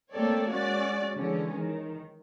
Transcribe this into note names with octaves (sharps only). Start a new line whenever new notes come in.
A3 A#3 C4 A4 C#5 D5
G#3 C#4 F#4 D5
D3 E3 G#3 C#4
D#3